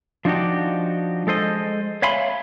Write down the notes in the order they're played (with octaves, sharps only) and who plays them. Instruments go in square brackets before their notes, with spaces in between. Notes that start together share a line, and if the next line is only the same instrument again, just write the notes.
[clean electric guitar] F3 D4 D#4 F#4 G4
G#3 A4 C5 D#5
C#5 E5 F5 G#5 B5 C6